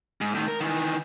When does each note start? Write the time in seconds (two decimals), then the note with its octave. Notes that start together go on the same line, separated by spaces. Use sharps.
0.21 G#2
0.35 A2 D#3
0.48 A#4
0.60 D#3 E3